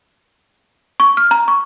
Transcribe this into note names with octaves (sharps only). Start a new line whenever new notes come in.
C#6
F6
A#5
C#6